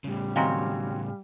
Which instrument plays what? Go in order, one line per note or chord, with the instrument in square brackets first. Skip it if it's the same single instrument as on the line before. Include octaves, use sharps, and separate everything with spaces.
[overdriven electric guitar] A2 C#3 [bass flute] G3
[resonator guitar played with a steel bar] D#3 F#3 C4 [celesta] F5 G5 G#5